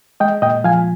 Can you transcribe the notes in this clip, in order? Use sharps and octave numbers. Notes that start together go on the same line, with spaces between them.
G#3 D#5 G5
A#2 D#5 G5
F3 F5 G#5